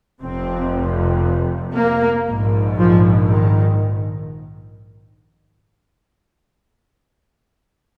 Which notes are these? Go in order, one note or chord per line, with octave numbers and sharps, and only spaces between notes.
F1 F2 C3 C4
A#3
A#1 G#2
F3
D#3